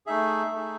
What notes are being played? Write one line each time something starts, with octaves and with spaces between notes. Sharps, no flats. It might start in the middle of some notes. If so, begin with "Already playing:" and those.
A3 D#4 G#4 E5
A3 D#4 G#4